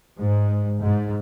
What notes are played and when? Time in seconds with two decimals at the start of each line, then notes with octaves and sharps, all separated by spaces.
0.17 G#2
0.82 G#2